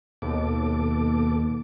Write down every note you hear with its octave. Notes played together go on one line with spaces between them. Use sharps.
D#2 B2 A4 D6